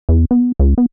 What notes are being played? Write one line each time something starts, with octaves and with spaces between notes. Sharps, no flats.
E2
B3
C#2
B3